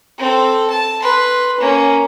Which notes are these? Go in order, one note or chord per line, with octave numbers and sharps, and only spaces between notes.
C4 A4
A5
B4 C6
A#3 C#4